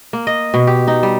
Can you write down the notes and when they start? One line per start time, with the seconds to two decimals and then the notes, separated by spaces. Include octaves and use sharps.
0.13 A#3
0.27 D#5
0.54 B2
0.67 G4
0.87 D#4
1.03 G3